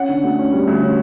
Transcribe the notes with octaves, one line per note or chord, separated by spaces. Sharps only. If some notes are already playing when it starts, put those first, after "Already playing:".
Already playing: C#4 F#5
D3
D2
C#4
G3
D2
C#4